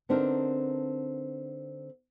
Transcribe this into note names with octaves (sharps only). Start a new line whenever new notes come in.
D3 B3 C4 D4 D#4 A#4